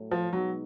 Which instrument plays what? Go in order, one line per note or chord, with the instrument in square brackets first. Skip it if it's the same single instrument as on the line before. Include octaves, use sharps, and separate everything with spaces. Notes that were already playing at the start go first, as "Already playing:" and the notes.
Already playing: [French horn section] A2 F#3 A3
[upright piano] F3
[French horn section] B2 G#3 B3 D#4 [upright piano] F#3